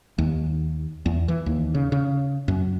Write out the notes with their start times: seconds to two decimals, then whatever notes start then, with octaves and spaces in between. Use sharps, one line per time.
0.18 D#2
1.06 E2
1.28 E3
1.46 D#2
1.75 C#3
1.92 C#3
2.48 F#2